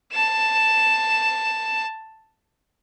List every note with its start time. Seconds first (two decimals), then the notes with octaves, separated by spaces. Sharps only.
0.13 A5 E7